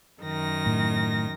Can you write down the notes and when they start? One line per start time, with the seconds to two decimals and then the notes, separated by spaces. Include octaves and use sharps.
0.21 F#2 D#3 A#6
0.66 A2